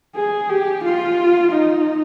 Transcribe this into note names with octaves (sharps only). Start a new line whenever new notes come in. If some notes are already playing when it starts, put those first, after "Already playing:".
G#4
G4
F4
D#4